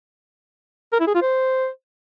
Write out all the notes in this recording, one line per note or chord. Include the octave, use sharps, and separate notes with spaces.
A#4
E4
G#4
F4
C5